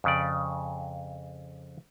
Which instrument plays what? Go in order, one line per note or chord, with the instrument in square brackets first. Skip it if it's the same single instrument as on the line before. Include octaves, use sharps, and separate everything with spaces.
[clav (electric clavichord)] F2 C#3 D5